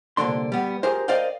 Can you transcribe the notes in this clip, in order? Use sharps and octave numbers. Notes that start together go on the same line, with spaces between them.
C2 A#2 D3 D4 C6
G3 B3
F4 G4 G#4 A#4 C5
A#4 C5 D5 D#5 F5 G5